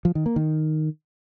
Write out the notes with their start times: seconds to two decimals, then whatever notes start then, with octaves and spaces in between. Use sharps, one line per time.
0.05 F3
0.15 D#3
0.26 A#3
0.36 D#3